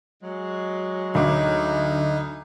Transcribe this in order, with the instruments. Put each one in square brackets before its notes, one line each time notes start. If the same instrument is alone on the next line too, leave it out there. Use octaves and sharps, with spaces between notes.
[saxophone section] F#3 G#3
[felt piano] D2 D6 [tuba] D3 [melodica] D#4